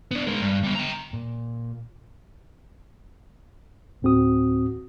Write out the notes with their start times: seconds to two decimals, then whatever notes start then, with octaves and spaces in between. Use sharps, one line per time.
0.11 B3 D4
0.27 G#3 A#4
0.41 G2
0.63 G3 B3
0.75 G5 A#5
1.13 A#2
4.02 D2 A2 C4 F#4 D#6